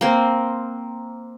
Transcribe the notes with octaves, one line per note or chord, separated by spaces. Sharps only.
A#3 C4